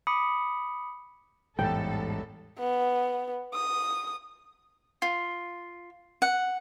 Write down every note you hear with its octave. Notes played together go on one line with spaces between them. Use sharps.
B5 D6 D#6 C#7
A1 E2 G#2 G3 A4 G5
B3
D#6
F4
F#5